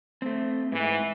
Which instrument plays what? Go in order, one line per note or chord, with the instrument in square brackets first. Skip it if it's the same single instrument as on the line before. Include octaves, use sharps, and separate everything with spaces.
[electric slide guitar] A3 C4
[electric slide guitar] G#2 [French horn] E3